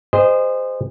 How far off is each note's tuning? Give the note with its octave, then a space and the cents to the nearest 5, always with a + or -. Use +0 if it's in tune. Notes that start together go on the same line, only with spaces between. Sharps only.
G#4 -35 C5 -15 D#5 -15